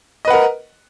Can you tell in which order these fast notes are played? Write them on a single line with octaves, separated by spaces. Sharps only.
D#5 B4 F#5 A#4